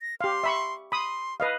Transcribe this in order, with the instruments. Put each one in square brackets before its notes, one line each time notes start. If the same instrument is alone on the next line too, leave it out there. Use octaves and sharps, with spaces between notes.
[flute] A#6
[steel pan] G4 F5 [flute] C6
[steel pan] E5 B5 C#6
[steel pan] B5 D#6 [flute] C6
[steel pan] B4 D#5 F5